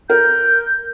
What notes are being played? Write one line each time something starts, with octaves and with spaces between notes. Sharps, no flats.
A#4 G6